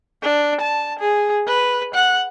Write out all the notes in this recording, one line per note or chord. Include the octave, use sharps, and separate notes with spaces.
D4
A5
G#4
B4
F#5